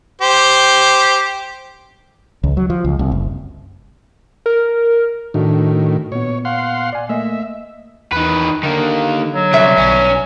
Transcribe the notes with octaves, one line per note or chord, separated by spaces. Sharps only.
G4 C5
C#2
F#3
F3
C#2
C2
F#1
A#4
A2 D#3 A3 D4 F#4
A#2 B3 C#5
F5 F#5 C6
D5 G#5
A3 A#3 D#5 E5
E2 D#3 B4
D3 D#3 A#3
F#3
C2 B2 G3 E5
B1 C#4